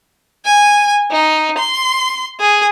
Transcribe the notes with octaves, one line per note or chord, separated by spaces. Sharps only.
G#5
D#4
C6
G#4